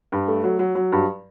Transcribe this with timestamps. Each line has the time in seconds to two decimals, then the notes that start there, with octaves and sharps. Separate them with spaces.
0.12 G2
0.28 A3
0.44 F#3
0.59 F#3
0.75 F#3
0.92 G2